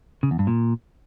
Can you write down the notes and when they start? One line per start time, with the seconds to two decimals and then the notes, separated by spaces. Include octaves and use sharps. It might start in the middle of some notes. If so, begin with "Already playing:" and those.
0.23 C#3
0.31 E2
0.39 G2
0.47 A#2